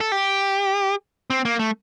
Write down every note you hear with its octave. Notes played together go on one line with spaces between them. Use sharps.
A4
G4
C4
A#3
A3